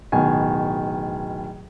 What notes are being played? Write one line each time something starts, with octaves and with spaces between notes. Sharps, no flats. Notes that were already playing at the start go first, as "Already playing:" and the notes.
D1 B2 D#3 G#5